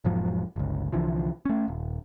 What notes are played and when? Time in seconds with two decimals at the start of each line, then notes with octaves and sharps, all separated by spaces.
0.05 E1 G#2 F3 F#3
0.56 G1 C#2
0.93 C2 D3 E3 F3
1.45 A3 C#4
1.68 D#1